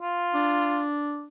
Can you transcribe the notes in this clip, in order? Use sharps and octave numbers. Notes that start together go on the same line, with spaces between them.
F4
D4